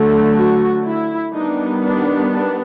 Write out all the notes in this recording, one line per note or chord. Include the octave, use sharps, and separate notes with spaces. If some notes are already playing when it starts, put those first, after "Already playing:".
Already playing: D3 F#3 A3
F#4
E4
D#3 G3 B3 D4 D#4
D4
D4